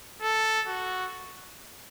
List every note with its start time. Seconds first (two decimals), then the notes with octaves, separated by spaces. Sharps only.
0.22 A4
0.68 F#4